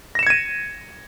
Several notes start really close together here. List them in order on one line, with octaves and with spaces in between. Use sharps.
A#6 E7 C#7 G#6 D#7